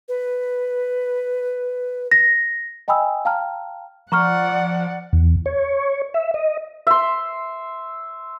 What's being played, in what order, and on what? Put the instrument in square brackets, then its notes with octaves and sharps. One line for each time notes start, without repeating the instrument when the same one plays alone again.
[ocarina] B4
[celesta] A#6
D#5 G5 G#5 B5 D#6 E6
F5 G5 A5 A#5 F6
[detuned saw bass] F3 [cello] D5 F#5 [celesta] A#5 C#6 F6
[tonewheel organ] E2
C#5
E5
D#5
[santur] E5 C6